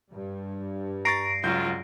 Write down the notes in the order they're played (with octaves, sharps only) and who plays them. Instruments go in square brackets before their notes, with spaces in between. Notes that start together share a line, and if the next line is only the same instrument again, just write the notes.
[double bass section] G2
[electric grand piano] A#5 C#6 A6 [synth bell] A#6 C7 D7
[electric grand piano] C#2 G6 [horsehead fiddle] F#3 F4